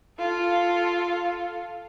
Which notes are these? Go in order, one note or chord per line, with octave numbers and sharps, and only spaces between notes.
F4 A4